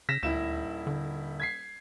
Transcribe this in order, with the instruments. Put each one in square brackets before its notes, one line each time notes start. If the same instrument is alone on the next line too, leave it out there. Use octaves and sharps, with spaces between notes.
[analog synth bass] C#3 [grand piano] A#6 B6 E7
[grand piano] D#1 E4 E7 [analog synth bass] D2
[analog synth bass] D3
[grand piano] G#6 B6 C7